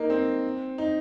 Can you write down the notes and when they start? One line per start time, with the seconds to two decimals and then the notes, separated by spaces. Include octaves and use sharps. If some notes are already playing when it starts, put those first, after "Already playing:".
Already playing: A#3 D#4
0.10 C4
0.78 D#4